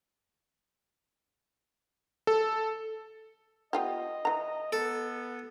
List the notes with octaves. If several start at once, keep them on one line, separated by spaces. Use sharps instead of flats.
A4
B3 F4 G4 D#5
E3 A#5
B3 A4